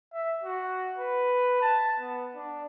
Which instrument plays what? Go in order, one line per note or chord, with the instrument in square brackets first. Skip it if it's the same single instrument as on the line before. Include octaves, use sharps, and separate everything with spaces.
[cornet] E5
F#4
B4
A5
B3
D4